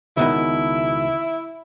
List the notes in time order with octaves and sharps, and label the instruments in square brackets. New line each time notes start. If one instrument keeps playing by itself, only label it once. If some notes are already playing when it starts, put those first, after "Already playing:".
[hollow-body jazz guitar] C#2 B2 D#3 [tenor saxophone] E4